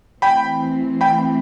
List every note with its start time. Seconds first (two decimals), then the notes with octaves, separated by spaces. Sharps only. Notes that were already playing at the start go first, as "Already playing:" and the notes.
0.22 E3 A3 C4 G5 B5
1.01 G5 B5